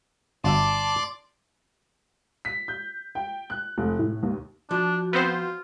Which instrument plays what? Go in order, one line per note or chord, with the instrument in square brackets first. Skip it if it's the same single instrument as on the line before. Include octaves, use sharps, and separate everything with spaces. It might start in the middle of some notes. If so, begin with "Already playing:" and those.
[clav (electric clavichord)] G1 F#4 E5 [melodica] D5 C6 D6 [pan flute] A5
[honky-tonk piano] B6
G6
G5
F#6
F1
A2
D#2
[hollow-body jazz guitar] F3 [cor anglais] D4 [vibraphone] F#4
[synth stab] B3 C4 C5 [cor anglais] F4